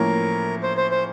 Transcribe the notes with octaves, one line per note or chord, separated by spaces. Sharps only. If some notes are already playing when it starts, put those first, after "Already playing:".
Already playing: A2 F3 A#3 C#4 E4 A#4
C5
C5
C5